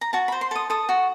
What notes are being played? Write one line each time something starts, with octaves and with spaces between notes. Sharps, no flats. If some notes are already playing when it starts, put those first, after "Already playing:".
A#5
F#4 A5
B5
C5
C6
A4 D#6
A4 D#6
F#4